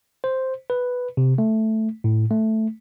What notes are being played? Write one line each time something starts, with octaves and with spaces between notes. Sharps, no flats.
C5
B4
C3
A3
A2
A3